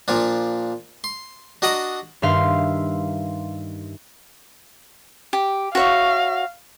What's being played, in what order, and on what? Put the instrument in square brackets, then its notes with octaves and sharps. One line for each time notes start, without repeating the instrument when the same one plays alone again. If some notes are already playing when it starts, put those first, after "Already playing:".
[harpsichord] A#2 F3 D4
C6
D4 F#4 D#5 F#5 A#5
[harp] G2 D#3 E5 F5 C6
[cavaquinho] G4
[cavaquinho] F#4 C#5 E5 [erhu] F5